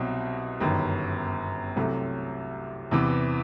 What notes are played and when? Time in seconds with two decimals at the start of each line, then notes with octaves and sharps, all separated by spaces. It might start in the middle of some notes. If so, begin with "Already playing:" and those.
Already playing: C2 B2 F#3 C4 D#4
0.60 G1 F#2 D#3
1.76 C2 C3 F#3 A3
2.91 E2 C3 E3